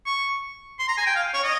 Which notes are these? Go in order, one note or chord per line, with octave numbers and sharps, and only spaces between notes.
C#6
C6
A#5
G#5
G5
F5
C#5
D#5